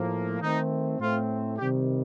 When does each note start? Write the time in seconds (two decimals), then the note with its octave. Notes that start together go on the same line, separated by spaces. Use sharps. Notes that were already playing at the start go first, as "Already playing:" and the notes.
Already playing: A2 F3 A#3
0.42 D#3 A3 C4 D#4
1.00 A2 A3 C4 F4
1.58 C3 D#3 G3 G4